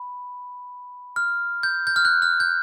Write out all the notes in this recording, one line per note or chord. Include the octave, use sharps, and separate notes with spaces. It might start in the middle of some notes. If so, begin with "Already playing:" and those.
Already playing: B5
F6
G6
G6
F6
F#6
F6
G6